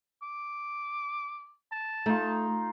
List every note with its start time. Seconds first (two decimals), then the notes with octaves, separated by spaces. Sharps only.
0.22 D6
1.72 A5
2.06 A3 D#4 F4